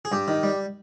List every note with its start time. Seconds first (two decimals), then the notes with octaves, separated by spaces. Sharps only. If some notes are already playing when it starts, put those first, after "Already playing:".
0.05 G#4
0.12 G2 G4
0.28 D#3
0.43 G3